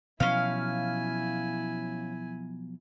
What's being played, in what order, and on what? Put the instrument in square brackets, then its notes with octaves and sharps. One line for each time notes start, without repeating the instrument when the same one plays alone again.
[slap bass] B2 F3 F#3 [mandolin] C#4 F5 [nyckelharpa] E4 G#5